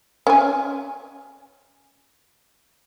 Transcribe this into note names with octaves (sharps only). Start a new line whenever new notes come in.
C#4 G#5